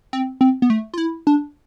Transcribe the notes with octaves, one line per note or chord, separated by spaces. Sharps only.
C4
C4
B3
A3
F4
E4
D4